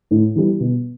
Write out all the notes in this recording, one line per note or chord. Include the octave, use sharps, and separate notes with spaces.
A2
E3 G3
B2